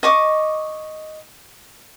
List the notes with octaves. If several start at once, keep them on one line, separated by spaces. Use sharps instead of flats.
D#5 C#6 D6